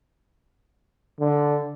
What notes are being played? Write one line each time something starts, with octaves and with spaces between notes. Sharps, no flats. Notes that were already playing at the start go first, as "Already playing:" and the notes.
D3